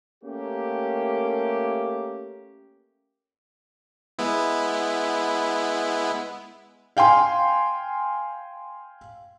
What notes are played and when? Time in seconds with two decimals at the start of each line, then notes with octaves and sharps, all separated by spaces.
0.23 A3 A#3 C#4 G4
4.19 G#3 B3 E4
6.97 F5 G5 G#5 C6